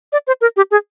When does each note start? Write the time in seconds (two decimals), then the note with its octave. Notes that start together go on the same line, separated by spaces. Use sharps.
0.13 D5
0.27 C5
0.41 A#4
0.57 G4
0.71 G#4